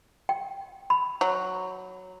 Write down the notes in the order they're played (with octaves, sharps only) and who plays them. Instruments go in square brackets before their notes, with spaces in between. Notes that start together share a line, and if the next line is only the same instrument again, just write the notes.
[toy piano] G5
B5
[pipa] F#3